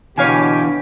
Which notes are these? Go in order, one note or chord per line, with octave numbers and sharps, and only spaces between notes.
B2 D3 E3 G4 C#5 F5 G#5